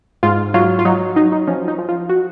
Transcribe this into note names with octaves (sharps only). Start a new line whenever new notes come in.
G#2 F4
F#3 F4
F4
F#3 D#4
F#3 D#4
D#4
F3 C#4
D#4
F3
F4
F#4